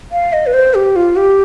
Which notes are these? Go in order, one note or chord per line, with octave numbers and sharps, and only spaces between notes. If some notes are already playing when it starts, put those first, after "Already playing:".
F5
D#5
B4
C5
G4
F4
G4